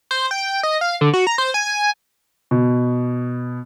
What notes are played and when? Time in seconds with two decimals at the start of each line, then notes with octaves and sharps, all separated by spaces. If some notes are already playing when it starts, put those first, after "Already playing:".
0.11 C5
0.31 G5
0.63 D#5
0.81 F5
1.01 D3
1.14 F#4
1.27 A#5
1.38 C5
1.54 G#5
2.51 B2